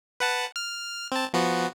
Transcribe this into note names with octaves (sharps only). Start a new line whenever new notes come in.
B4 F#5 A5
F6
C4 A5
F3 B3 F#4